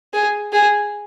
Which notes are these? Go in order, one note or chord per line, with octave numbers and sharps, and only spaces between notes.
G#4
G#4